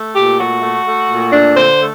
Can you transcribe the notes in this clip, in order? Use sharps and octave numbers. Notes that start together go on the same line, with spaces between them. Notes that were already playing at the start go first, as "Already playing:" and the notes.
Already playing: A3
A#2 G4
A3 F#4
A3
A3
A#2
A3 D4
D3 C5
A3